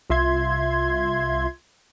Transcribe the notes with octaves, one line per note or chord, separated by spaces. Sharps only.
C2 F4 E5 C6 G#6